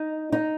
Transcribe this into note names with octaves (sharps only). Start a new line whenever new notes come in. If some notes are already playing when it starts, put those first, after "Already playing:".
Already playing: D#4
D#4